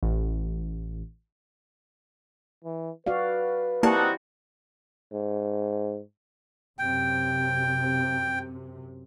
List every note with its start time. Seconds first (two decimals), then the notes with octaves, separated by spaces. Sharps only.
0.03 A1
2.64 E3
3.06 F#4 B4 D5 F5
3.83 A#3 C4 D#4 E4 F#4 G4 D5 A5
5.13 G#2
6.79 F#2 C3 G5